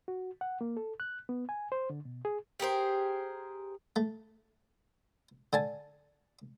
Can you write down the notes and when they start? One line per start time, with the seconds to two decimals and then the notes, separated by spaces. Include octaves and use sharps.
0.08 F#4
0.41 F#5
0.61 A#3
0.77 A4
1.00 F#6
1.29 B3
1.49 G#5
1.72 C5
1.90 D3
2.05 B2
2.25 G#4
2.60 G4 G#4 A#4 C5
3.96 A3
5.53 D3 G#5 A5